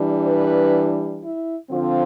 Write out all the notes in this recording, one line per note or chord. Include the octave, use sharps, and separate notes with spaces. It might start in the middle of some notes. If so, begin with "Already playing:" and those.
Already playing: E3 G3 D4
B4
E4
D3 F3 C4 F4